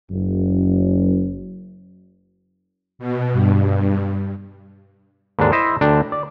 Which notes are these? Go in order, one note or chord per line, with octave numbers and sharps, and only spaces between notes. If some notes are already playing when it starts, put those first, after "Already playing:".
F#1 F#2
B2
G2
D#2 G#2 D3 D4
E4 C5 D#5 E5
D2 D3 D4 G5
D5